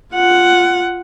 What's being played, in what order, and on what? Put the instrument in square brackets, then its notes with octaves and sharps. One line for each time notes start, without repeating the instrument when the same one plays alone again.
[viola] F4 F#5